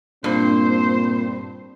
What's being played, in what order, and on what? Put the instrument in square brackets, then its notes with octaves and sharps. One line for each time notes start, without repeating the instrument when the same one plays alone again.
[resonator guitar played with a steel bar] G2 [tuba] A#2 [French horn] C4 [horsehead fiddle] C5